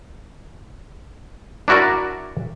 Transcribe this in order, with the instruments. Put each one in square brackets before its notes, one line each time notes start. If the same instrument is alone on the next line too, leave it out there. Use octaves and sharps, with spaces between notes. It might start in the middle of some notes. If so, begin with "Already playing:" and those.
[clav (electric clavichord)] D4 E4 F#4 A#4 D5